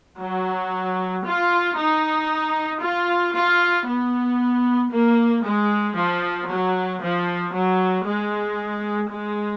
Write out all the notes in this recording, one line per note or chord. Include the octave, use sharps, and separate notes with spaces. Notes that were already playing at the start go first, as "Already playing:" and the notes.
F#3
F4
D#4
F4
F4
B3
A#3
G#3
F3
F#3
F3
F#3
G#3
G#3